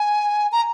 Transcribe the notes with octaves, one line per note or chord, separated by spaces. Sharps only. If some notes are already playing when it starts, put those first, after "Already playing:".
Already playing: G#5
A#5